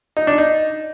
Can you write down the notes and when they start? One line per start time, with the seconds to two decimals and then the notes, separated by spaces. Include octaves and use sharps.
0.17 D#4
0.27 D4
0.38 D#4